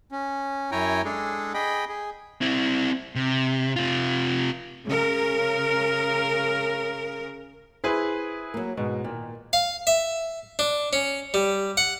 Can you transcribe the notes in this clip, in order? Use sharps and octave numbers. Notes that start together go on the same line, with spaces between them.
C#4
F#2 E4 C#5 G5 G#5 A#5
G#3 D4 G#4 A4
G#4 D#5 G5 B5
G#4
C4 E4
C3
C3 F4
C#3 A#4
E4 G#4 B4 C5
F#3 A#3
G#2 B2
A#2 D#3
F5
E5
D4
C#4
G3
F#5